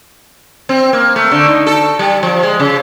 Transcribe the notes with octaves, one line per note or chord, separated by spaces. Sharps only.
C4
A#3
A3
D3
D#4
A4
G3
F3
G#3
C#3